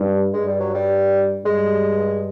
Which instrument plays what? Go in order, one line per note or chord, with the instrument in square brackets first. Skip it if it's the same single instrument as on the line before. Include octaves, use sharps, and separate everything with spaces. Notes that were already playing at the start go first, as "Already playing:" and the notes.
Already playing: [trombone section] G2
[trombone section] G2 [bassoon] G#3
[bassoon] G3
F#3
G3
[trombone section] G2 [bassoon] G#3